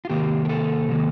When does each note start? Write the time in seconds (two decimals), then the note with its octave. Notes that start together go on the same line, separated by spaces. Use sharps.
0.05 F4
0.10 C3 D#3 A#3 G4
0.45 A#4
0.49 A4
0.89 C3 D#3 A#3